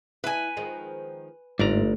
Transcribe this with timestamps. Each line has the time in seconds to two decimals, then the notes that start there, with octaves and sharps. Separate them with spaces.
0.24 E4 B4 G#5
0.57 D#3 F3 G#3
1.59 G1 G#2 A3 D5 A#5